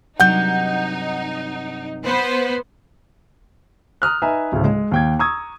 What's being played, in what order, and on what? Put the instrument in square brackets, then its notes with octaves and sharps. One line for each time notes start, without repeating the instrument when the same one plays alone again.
[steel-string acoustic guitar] G2 C3 F#3 [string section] D#4 [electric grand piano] F#5 G6
[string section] B3 B4 C5
[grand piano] A#5 D#6 F6 F#6
D#4 B4 E5 G#5 A#5
D1 D2 A2 C#3
G#3
D#2 G5 G#6
A#5 C#6 D#6 E6 G#6